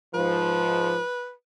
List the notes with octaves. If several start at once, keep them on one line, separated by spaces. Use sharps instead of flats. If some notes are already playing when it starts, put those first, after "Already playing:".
G#2 F3 B4